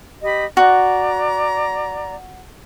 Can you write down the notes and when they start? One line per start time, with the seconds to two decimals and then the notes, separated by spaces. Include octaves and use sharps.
0.22 G4 D#5 B5
0.57 F#4 D5 A#5